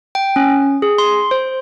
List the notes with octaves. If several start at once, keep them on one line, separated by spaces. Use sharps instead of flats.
G5
C#4
G#4
C6
C5